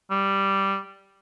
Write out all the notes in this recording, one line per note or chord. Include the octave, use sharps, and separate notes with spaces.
G3